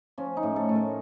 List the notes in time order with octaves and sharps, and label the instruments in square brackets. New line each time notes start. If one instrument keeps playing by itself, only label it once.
[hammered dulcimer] F3 C#4
D#4
A2
A4
A2
A#4